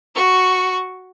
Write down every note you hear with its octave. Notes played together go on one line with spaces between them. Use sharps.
F#4 C#6